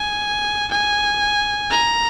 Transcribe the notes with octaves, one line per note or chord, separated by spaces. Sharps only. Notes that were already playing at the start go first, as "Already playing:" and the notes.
Already playing: G#5
G#5
A#5